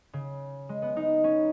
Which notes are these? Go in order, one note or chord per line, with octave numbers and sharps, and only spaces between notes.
C#3
G#3
B3
D#4
C#4